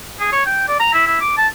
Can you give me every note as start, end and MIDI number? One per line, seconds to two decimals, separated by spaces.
0.20 0.28 68
0.33 0.42 73
0.46 0.64 79
0.68 0.78 74
0.80 0.93 82
0.93 1.06 64
1.07 1.16 64
1.21 1.35 86
1.37 1.48 81